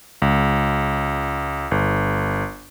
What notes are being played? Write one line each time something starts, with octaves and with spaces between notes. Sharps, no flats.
C#2
G1